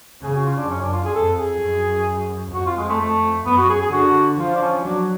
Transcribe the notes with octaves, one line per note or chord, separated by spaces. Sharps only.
C#3 G#4
F#4
F4
D4
F#2 C#4
D4
F4
G#4
F2 A4
G#4
F#2
F2 F#4
F4
G#3
A3
A3
F#2 B3
F#4
G#4
G#4
D3 F#4
F3 F4
D4
C#4
F#3 D4